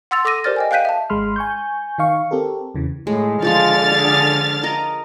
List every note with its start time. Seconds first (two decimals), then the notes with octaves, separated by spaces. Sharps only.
0.11 F#5 C6 E6 A6 F7
0.25 A4 D6 E6 A#6 D#7
0.44 G4 A#4 C5 D5 F6 A6
0.56 D#5 G5 G#5
0.71 F5 G5 F#6 G6 B6 D#7
0.85 E5 F5 A5
1.10 G#1 G#3 B5 C6 F6
1.36 G#5 C#6 G6
1.98 D#3 D#4 F5 C#6
2.31 C4 G4 A4 A#4
2.74 E2 C#3 E3
3.07 A2 G#3
3.42 D3 F3 G#3 F4 F6 A6
3.91 G#4
4.63 A#4 D#5 A#5